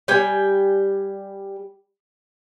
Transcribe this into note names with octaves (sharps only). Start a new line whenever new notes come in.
G3 G5 G#5